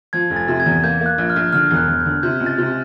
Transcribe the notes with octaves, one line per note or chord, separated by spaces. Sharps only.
F3 G#6
F1
A6
C3
G#6
E2
A#3 G6
A#3
F#6
A#1
F6
A#1
D3 F6
E1
F#6
E1
G6
D3
C3 G6
C#2
A6
C3